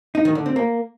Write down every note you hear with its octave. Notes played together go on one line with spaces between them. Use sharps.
D#4
D#3
D3
C4
A#3